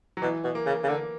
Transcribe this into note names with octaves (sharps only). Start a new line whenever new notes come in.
F#3
B2 E3
B2
A#3
C#3
C#3
D3 A#3